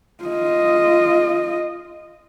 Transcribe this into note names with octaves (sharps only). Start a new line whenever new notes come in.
F4 D#5